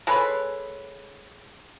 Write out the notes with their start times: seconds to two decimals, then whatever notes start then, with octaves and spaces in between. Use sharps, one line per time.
0.07 G#3 A4 B4 C#5